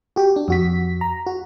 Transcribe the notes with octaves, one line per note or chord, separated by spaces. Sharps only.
F#4 G4
D4
F2 F#4 B6
A#5
F#4